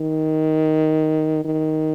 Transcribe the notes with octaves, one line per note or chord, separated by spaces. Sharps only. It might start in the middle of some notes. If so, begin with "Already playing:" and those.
Already playing: D#3
D#3